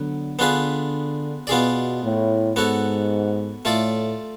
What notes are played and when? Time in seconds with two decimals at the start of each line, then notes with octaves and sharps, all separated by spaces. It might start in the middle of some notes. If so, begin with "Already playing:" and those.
Already playing: D3 F#3 B3
0.39 D3 B3 D4 F4 G#4 B4
1.47 B2 B3 F4 G#4 D5
2.02 A2
2.56 G#2 B3 F#4 A4 C#5
3.65 A2 A3 F4 A4 D5